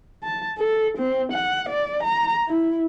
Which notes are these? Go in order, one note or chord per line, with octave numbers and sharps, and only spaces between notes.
A5
A4
C4
F#5
D5
A#5
E4